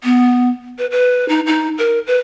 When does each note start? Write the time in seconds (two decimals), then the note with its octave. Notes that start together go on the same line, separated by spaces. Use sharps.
0.04 B3
0.78 B4
0.91 B4
1.29 D#4
1.47 D#4
1.78 A#4
2.07 B4